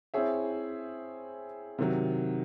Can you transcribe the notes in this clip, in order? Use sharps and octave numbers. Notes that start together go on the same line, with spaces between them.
C4 E4 G#4 C#5 E5
C3 D#3 F#3